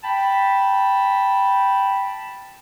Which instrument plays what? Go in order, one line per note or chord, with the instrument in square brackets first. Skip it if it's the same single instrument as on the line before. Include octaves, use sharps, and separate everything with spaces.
[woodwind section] G5 A5 B5